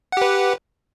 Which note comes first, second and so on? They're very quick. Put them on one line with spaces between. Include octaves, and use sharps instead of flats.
F#5 G4 B4